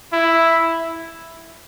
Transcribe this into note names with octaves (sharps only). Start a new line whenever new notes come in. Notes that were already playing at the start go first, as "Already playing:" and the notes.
E4